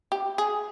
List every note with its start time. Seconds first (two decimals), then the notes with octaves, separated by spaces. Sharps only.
0.12 G4
0.38 G#4